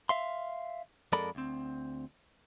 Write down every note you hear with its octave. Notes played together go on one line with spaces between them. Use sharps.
E5 F5 C6
F2 G#3 A4 A#4 D5 B5
D2 C4